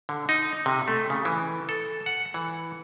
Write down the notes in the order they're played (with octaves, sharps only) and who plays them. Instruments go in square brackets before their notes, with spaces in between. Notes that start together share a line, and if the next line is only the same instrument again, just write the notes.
[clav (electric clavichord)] D3
D#4
C3
A3
C#3
E3
A4
F#5
E3